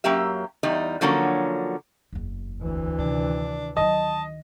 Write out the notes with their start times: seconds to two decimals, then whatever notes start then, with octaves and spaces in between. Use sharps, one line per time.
0.04 F#2 F#3 A#3 G4 E5
0.63 E2 G3 D#4
1.01 D3 F3 F#3 A#3 C#4 F#4
2.13 F#1 E2
2.61 D2 E3
2.99 C3 D#3 D4
3.77 D#3 F#3 D#5 A5